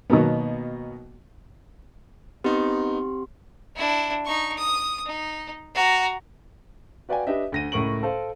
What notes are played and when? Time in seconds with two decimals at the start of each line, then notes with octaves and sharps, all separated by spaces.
0.10 B2 D#3 F#3 A#3 B3
2.44 B3 C4 D#4 G4 C6
3.76 D4 E4
4.25 D#4 C#6
4.58 D#6
5.06 D#4
5.75 F#4 A#5
7.09 F#4 B4 D5 F5 G5 G#5
7.27 D4 G4 B4 D#5 E5
7.52 D2 A#6 D#7
7.72 C#2 A2 A#4 C#6 D7 F#7
8.03 A4 C5 F5